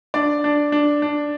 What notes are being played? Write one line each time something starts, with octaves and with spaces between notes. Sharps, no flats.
D4 D5
D4
D4
D4